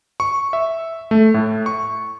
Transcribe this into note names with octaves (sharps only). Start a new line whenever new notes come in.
C#6
E5
A3
A2
C#6